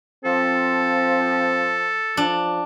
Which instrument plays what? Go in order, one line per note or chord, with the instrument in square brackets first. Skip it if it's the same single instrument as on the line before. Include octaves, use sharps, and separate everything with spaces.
[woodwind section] F3 [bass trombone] C4 [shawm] A4
[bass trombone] F3 [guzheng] D4